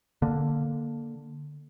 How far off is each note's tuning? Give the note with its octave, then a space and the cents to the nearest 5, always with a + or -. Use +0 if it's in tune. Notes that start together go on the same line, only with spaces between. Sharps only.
D3 +0 A#3 +0